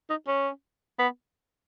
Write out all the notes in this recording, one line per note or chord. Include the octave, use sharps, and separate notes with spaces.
D#4
C#4
B3